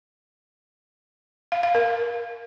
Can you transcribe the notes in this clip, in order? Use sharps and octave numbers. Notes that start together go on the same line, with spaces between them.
F5
F5
A#4